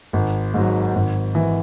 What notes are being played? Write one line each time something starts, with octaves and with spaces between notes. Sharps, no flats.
G#1
G#2 F#3
G#1
E3